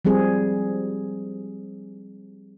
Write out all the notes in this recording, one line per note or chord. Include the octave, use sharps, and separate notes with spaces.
F3 G3 C4 G#4